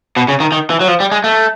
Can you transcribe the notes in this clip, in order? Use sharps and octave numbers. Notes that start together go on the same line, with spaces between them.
B2
C#3
D#3
D#3
E3
F#3
F3
G3
G#3
A3